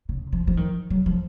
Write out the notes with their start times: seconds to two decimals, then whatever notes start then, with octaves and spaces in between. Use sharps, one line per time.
0.09 C#3
0.32 F3
0.47 F3
0.57 D#3
0.90 F#3
1.06 F3